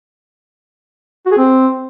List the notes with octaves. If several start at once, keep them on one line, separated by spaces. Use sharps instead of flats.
F#4
G#4
C4